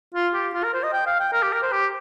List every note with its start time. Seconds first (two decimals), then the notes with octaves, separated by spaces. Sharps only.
0.14 F4
0.34 G4
0.54 F4
0.64 A#4
0.73 C5
0.83 D#5
0.93 G5
1.06 F5
1.20 G5
1.32 A#4
1.43 G4
1.52 A#4
1.62 C5
1.72 G4